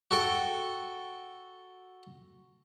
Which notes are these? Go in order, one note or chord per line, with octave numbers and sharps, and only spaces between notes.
F#4 A4 G5